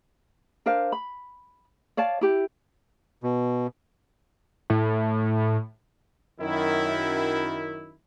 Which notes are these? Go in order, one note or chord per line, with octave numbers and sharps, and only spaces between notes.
D4 A#4 C5 F5
B5
C#5 D5 F5 A5
E4 G4
B2
A2
F#2 D#3 E4